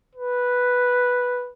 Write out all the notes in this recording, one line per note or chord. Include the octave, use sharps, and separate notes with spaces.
B4